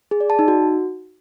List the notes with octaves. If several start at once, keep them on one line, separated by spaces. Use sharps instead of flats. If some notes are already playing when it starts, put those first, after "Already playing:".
G#4
D5
A5
D#4
F#4